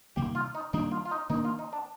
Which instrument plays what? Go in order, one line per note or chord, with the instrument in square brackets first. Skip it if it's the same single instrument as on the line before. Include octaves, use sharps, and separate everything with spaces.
[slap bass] C3 D#3 G3 A#3 [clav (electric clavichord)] G4
[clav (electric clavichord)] F4
D#4
[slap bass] D#3 G3 A#3 D4 [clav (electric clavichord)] D#4
[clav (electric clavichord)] F4
F4
D#4
[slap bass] D#3 A#3 D4 [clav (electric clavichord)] D#4
[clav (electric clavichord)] F4
D#4
D4